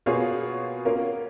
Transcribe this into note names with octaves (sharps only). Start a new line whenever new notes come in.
B2 A#3 F4 G#4 C#5
A#3 C#4 F4 A#4